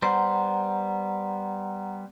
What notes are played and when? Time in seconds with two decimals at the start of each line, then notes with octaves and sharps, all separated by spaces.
0.02 G3 B3 C5 F#5 A#5